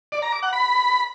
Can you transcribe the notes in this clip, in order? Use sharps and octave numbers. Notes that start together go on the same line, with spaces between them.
D5
A#5
D6
F#5
B5